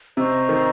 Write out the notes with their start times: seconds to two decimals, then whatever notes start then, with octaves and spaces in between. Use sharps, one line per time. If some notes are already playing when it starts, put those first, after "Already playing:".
0.17 C3 C5 D#5 A#5 C#6
0.49 D#3